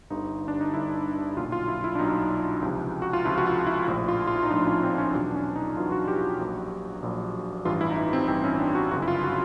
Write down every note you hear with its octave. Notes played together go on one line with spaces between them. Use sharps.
G1 G2 D3 D#4
D4
D#4
G1 G2 D3 E4
B1 A#2 F#3 F4
F4
E4
E4
D4
B1 A#2 F#3 D#4
C#2 C3 F3
F#4
F4
C#2 C3 F3 E4
F#4
F4
E4
A#1 A2 F3 E4
F4
F4
E4
D#4
A#1 A2 F3 D4
C#4
C4
C#4
E2 B2 F#3 D4
D4
C#4
D#4
E2 B2 F#3 F4
F#4
G4
F#4
A#1 A#2 F#3
A#1 A#2 F#3
A1 G2 E3 F4
E4
D#4
E4
C4
A1 G2 E3 C4
C#4
D4
F#4
G1 F#2 C#3 F#4
E4
F4
F#4